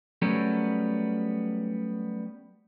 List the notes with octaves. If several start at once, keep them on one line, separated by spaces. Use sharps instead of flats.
F#3 G3 A3 B3 C#4 A#4